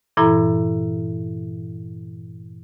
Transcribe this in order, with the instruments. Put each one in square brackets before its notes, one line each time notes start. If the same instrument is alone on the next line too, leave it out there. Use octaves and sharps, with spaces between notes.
[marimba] G2 A#2 E3 E4 A4 A#5